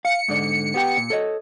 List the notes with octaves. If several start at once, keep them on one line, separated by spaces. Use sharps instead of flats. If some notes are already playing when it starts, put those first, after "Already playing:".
F5 C#7
G#2 D3 D5
B3 G4 G5
A#2
A4 C#5 D#5